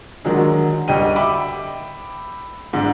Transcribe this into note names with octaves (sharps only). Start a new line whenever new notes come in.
D3 D#3 F#3 G#3
D2 G3 D#5 G5 D#7
E5 G5 B5 D6
G#2 D3